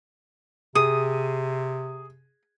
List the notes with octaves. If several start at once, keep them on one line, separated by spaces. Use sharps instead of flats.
C3 G#4 D#6 D#7